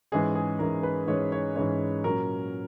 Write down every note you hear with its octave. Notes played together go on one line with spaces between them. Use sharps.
G#2 E3 G#3 C#4 G#4
G#4
G#2 E3 G#3 C#4 A#4
B4
G#2 E3 G#3 C#4 C#5
C#5
G#2 E3 G#3 C#4 C#5
A#2 F#3 C#4 A#4